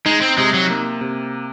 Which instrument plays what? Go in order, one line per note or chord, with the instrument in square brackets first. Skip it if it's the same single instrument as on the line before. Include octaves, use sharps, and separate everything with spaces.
[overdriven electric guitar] G#3 [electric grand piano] D#4
[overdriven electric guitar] C4
[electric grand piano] C3 [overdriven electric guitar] G#3
[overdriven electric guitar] F#3
[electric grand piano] A#3
C3